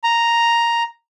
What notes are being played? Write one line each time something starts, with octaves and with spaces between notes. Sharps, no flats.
A#5